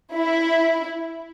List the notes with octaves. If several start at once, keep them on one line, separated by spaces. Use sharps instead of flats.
E4